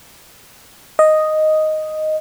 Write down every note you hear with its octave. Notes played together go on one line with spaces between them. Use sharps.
D#5